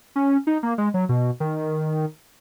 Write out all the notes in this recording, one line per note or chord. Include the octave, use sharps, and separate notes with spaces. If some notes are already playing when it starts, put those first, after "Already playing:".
C#4
D#4
A#3
G#3
F#3
B2
D#3